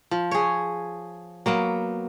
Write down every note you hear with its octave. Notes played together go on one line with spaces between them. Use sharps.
F3
G#4 C#5
F#3 A#3 B3